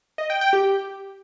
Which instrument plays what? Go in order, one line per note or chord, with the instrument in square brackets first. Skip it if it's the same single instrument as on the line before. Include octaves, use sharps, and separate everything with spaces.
[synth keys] D#5
G5
G5
G4